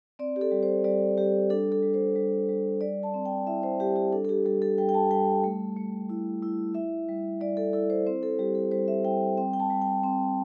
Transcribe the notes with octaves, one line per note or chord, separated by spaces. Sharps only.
C4 D5
G4
A4
G3
C5
G3 D5
G3 G4
D4 A4
A4
G3
C5
G3
G3
G3 D5
A5
C4
G5
E4 E5
C5
G3 G4
G4
D4 A4
A4
G4
G3 A4
A4
G3 G5
G5
A5
G3 G5
A3
A3
E4
E4
E4 E5
G3
G3 D5
A4
E4 A4
C5
C4 C5
A4
G3 G4
A4
G3 C5
E5
G3 G5
C4 G5
G5
A5
G3
G5
C4